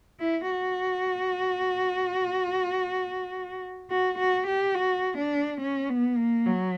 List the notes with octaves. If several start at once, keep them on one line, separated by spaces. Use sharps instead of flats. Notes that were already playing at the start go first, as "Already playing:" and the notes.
E4
F#4
F#4
F#4
G4
F#4
D4
C#4
B3
A#3
F#3